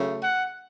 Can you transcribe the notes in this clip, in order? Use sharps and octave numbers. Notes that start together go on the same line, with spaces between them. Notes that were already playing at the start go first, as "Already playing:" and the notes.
Already playing: C#3 F#3 A3
F#5